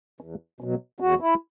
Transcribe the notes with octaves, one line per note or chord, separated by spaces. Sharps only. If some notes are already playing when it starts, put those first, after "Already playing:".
E2
B2 F#3
E2 F#4
E4